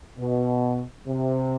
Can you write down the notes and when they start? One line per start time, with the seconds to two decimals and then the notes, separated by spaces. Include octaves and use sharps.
0.19 B2
1.08 C3